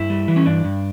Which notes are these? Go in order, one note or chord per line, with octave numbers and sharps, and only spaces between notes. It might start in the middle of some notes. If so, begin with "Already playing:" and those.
Already playing: G2 E4
G3
E3
C#4
G2 D4
G2